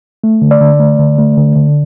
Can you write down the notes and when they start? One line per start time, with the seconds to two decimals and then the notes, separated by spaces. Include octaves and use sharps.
0.24 A3
0.42 D3
0.51 D5
0.61 D3
0.80 A3
0.99 D3
1.18 A3
1.37 D3
1.56 D3